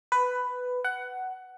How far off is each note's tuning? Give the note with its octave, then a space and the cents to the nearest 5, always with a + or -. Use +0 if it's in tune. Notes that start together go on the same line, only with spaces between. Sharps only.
B4 +10
F#5 +15